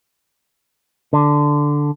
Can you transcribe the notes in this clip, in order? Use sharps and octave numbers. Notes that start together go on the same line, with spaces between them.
D3